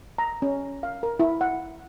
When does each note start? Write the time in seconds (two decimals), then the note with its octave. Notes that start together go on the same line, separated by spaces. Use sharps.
0.18 A#5
0.42 C#4
0.83 F5
1.03 A#4
1.19 E4
1.41 F#5